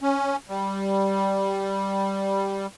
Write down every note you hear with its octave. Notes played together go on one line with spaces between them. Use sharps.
C#4
G3